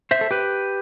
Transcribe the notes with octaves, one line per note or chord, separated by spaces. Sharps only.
C5 E5
A4
G4 B4